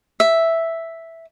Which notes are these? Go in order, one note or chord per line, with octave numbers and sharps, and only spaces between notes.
E5